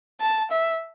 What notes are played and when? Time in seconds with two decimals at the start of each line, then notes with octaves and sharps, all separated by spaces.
0.20 A5
0.51 E5